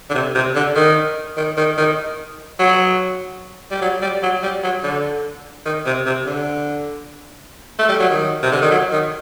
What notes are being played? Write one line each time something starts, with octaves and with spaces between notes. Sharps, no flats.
D3
C3
C3
D3
D#3
D#3
D#3
D#3
F#3
G3
F#3
G3
F#3
G3
F#3
D3
D#3
C3
C3
D3
A3
G3
F#3
D#3
C3
D3
D#3
F#3
D#3